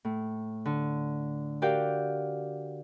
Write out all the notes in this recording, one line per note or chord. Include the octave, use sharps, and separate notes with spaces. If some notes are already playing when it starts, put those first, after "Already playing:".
A2
D3
F#4 G4 A#4 D5 F5 G5